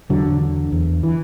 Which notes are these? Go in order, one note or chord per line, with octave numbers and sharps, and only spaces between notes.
E2 D3 F#3
D3
E2
E3